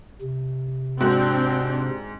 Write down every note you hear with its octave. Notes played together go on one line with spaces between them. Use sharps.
C3
G#2 C4 D4 F#4